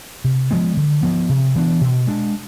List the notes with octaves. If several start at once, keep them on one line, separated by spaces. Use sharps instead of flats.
C3
F3 G#3 B3
D3
F3 B3
C3
E3 B3 D4
B2
G#3 D4